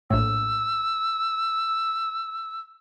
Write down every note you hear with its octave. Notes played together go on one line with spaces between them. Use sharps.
A#1 A2 E6